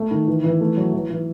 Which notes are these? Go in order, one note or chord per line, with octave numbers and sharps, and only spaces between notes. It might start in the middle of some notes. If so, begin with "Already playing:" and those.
Already playing: A3
D#3
E3
E3
A3
F#3
E3
E3